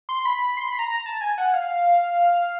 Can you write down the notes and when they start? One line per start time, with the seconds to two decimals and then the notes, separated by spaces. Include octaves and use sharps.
0.09 C6
0.25 B5
0.57 C6
0.68 B5
0.79 A#5
0.90 A#5
1.06 A5
1.21 G#5
1.38 F#5
1.54 F5